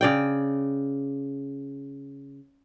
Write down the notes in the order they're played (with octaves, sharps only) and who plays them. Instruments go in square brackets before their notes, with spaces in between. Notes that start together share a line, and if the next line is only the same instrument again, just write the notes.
[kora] C#3 D5 G5